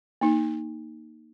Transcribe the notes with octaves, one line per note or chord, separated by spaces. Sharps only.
A#3 D#4